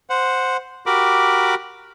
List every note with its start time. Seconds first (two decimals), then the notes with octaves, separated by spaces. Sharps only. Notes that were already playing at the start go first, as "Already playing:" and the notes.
0.10 C5 F#5
0.86 F#4 G4 A#4 B5 D6